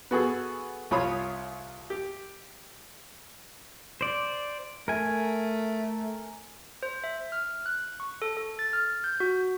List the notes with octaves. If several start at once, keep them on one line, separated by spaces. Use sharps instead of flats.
B3 F#4 G#4 A4
C2 F4 C#5 B5 D#6
G4
C5 D5
A3 A#4 G#5
C5
E5
F6
F#6
C#6
A4
A4
A6
F6
G6
F#4